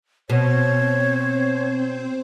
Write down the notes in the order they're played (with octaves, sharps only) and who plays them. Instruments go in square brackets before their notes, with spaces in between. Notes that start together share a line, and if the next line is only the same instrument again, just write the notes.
[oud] B2 [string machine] C4 C5 [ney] C#5